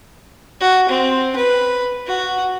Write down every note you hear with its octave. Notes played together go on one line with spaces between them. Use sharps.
F#4
C4
B4
F#4